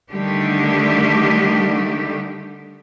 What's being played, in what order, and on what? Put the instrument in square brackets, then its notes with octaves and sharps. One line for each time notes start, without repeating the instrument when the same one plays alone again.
[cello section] D3 D#3 G3 A3 G4